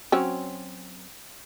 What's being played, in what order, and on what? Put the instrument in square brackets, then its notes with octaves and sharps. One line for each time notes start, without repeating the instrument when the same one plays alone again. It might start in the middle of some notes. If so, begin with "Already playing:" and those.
[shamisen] F#3 C4 C#4